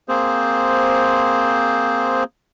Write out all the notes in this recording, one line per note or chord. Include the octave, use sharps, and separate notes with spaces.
A#3 C4 G#4 C5